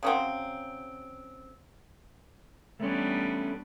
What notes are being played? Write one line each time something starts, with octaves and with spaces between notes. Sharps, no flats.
C#3 F#3 C4
G3 A3 B3 C#4 D4